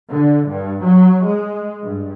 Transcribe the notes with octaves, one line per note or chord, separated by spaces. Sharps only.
D3
G2
F#3
G#3
G2